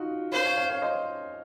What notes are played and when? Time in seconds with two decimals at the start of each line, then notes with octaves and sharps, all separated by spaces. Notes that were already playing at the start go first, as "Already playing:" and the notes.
Already playing: D#4 F4 F#4
0.32 C5 C#5 F5
0.45 C#5 F5
0.57 C#5 F5
0.69 C#5 F5
0.82 C5 D#5